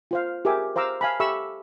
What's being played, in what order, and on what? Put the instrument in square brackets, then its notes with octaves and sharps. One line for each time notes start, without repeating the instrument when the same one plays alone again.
[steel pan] F4 C5 F5
G4 G#4 A#4 E5 G#5 D6
C5 F5 A#5 D6 E6
F5 G#5 A5 B5
G4 A4 E5 B5 C#6 E6